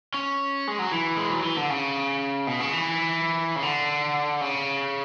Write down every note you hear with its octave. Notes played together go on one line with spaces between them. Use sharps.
C#4
G#3
F#3
E3
G#3
F#3
E3
D3
C#3
B2
C#3
E3
C#3
D3
C#3